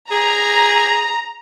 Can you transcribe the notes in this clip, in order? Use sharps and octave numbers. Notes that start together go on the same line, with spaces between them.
G#4 A#5